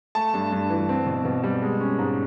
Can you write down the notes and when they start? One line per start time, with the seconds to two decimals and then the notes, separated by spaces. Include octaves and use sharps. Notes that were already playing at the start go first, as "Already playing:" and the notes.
0.15 A3 A5
0.34 G2
0.52 G2
0.70 E3
0.89 C4
1.06 B2
1.25 B2
1.43 G3
1.62 G#3
1.80 C#4
1.98 G#2